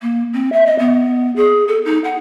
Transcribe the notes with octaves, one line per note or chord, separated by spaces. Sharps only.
A#3
C4
E5
D#5
B3
G#4
A4
D#4
F#5